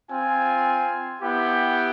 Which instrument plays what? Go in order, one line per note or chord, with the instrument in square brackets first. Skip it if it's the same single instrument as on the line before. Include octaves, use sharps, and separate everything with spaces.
[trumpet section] C4 F4 G#5
B3 E4 G4 G5